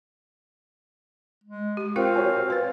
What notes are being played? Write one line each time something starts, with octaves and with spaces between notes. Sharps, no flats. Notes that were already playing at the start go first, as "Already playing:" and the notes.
G#3
G4
C4 F4 A#4 F5 G5
F#4 C#5 G#5
B4 C5 A6